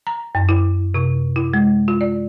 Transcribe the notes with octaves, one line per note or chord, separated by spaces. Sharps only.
A#5
F#2
E4
C3
E4
G#3
F4
D5